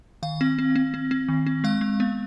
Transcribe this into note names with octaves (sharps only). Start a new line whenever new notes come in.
D#3 F5
C4
C4
C4
C4
C4
D#3
C4
G#3 F5
G#3
B3